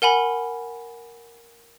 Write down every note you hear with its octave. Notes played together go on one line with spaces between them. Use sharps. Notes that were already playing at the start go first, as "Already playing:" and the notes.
A#4 F#5 G#5 B5